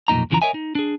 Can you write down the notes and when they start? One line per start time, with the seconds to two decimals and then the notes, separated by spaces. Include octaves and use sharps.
0.08 B1 F2 A#2 D#4 A#5
0.30 E2 C#3 E3 F3 A#5
0.42 A#4 C#5 D#5 E5 G#5
0.54 D#4
0.75 D4 G#4